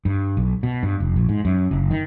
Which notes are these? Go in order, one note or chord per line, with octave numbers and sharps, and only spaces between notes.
G2
B1
B2
G2
F1
A#1
G#2
F#2
F#1
D#3